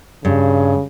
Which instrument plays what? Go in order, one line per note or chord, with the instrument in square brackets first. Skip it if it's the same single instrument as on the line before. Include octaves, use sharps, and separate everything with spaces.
[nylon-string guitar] G2 [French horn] C#3